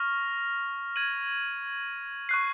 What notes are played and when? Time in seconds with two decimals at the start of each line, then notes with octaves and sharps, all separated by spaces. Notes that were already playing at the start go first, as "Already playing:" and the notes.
Already playing: C#6 F6 A#6 F7
0.96 G#6 D#7 F#7
2.29 C#6 F#6 C7